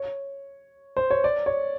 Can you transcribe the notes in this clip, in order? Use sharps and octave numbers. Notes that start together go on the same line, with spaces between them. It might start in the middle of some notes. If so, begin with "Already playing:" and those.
Already playing: C#5
C5
C#5
D5
C#5